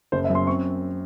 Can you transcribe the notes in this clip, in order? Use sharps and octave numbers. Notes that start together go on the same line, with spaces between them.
F#1 C5
E5
F#2
C6
C4 C#6